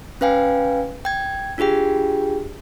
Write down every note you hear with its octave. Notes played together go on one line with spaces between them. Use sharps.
C#4 B4 F5 G5 G#5
G5 G#6
D4 F4 G4 G#4 G5